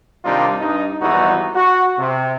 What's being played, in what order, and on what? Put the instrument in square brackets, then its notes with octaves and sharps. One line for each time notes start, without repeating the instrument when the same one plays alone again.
[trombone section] C3 D#3 G3 D4 D#4 F4
G2 D#4
G#1 E2 E3 G3 D#4 F#4
F#4
C3